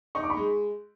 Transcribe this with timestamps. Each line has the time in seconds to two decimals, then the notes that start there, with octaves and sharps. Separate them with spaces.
0.15 D#4 C#6
0.23 D6
0.30 B5 C#6
0.37 G#3